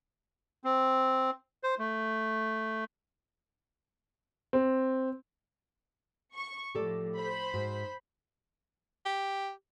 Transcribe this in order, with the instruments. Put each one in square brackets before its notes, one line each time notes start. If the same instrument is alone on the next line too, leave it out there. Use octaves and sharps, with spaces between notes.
[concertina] C4
C5
A3
[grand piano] C4
[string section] C#6
[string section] A2 F3 [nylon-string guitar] G4 A4 D5
[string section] C5 B5
[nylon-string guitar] G#2 F#4
[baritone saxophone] G4